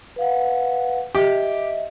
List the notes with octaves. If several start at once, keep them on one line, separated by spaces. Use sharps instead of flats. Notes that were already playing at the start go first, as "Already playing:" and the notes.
B4 F5 F#5
G4 D#5 E5